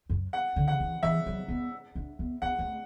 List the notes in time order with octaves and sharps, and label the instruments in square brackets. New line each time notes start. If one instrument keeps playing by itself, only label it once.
[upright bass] F#2
[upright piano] F#5
[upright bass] D3
[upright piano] F#5
[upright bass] E3
[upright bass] E3 [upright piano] E5
[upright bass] F#3
B3
D4
B3
[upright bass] B3 [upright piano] F#5
[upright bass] A3